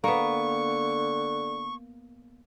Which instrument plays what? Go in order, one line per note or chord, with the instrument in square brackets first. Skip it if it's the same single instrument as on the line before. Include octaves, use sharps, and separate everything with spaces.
[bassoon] D3 [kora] A#3 B3 [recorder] C#6